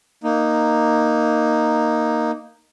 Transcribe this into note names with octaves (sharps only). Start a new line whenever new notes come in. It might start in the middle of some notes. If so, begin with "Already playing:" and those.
A#3 D#4